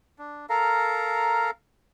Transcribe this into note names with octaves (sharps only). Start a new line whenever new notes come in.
D4
A4 A#4 F5 A#5